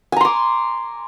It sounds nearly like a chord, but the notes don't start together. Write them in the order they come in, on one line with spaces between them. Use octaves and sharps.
G#5 A#5 C6 D6